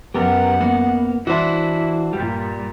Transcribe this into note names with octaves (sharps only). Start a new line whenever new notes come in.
F#2 B3 G4 A#4 F#5
A#3 B3
E3 D4 E4 F#4 C5
G2 A#2 G3